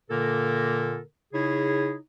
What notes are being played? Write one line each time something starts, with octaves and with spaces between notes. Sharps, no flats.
A#2 D3 A#3 A4 A#4
C#3 D#4 E4 G#4 C#5